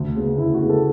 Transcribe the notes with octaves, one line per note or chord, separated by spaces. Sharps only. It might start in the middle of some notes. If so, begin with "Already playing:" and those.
Already playing: D2
C#3 G#3 B3
D2 E4
F#4
C#3 G#3 B3
A4